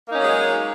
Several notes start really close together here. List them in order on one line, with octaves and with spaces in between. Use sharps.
A#3 D#4 C#4 F#3 G#3